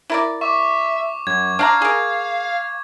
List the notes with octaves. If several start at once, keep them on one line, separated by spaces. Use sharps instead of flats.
E4 A#4 D5
E5 C#6 D6
F#2 G#6
D4 F5 F#5 A#5
G#4 A#4